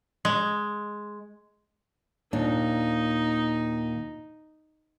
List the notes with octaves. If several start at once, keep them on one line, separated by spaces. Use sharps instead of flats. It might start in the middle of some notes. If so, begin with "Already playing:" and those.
G#3
D#2 A#2 D4 D#4